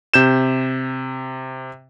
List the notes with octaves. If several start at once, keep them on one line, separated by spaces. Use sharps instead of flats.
C3 G6 E7